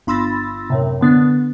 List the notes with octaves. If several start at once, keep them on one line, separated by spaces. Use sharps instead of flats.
G1 B5 C6 E6 A6 A#6
F#2 A2 C3
D3 B3 D4